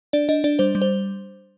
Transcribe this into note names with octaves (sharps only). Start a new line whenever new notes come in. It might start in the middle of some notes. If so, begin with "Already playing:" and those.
D4 D5
D4 D#5
D4 D5
G3 C5
G3
C5